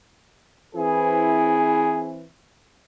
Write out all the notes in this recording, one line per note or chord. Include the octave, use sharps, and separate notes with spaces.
E3 C4 E4 G#4